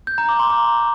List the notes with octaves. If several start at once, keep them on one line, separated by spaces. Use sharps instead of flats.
G6
A#5
D6
C6
A#5